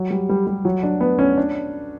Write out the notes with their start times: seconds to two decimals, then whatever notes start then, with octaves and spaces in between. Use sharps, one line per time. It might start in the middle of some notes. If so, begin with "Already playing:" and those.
Already playing: F#3
0.10 G3
0.29 G3
0.47 G3
0.65 F#3
0.83 D4
1.01 B3
1.19 C#4
1.38 D4